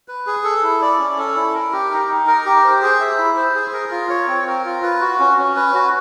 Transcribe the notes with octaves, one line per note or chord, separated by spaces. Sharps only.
B4
G#4
A4
E4
D5
C#4
A4
E4
A#4
G4
D#4
D#4
A#4
G4
C5
G#4
E5
E4
C5
G#4
A#4
F4
C#5
C4
A#4
F4
B4
F#4
C#4
C#4
B4
F#4